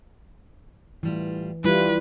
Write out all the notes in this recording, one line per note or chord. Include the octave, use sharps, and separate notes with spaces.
A2 E3 G3 F4
E3 G3 E4 F4 B4